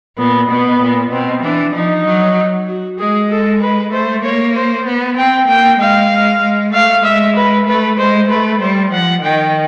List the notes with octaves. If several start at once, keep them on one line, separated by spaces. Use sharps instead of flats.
A#2 B3
B2 B3
A#2
B2 C4
E3 D4
F3 D#4
F#3
F#4
G#3 G#4
A4
B4
A3 C5
A#3 C#5
C5
B3
C4 G5
A#3 G5
G#3 F5
G#3
G#3
A3 F5
G#3 E5
B4
A3 B4
G#3 C5
A3 B4
G3 C5
F3 F#5
D#3 G5